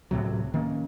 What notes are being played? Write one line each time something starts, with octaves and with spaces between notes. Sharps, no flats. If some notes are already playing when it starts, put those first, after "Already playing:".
C#2 A2 C3 F#3
D#3 A#3 C#4